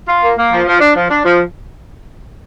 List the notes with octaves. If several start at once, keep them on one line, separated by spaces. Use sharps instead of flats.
F4
A#3
A#3
F3
F3
D4
F3
D4
F3